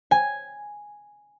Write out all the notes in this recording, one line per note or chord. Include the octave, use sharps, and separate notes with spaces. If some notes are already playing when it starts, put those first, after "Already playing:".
G#5